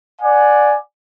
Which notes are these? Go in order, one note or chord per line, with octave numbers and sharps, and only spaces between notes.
D5 F#5 G#5